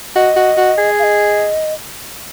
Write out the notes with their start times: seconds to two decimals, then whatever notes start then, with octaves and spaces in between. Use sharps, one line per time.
0.16 F#4 D#5
0.37 F#4
0.57 F#4
0.78 G#4
0.99 F5
1.03 D#5